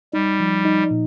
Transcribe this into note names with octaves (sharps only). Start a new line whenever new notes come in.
G3 D#4
F3
D#4
A#2